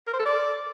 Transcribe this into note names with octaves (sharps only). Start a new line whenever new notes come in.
A#4
C5
A4
D5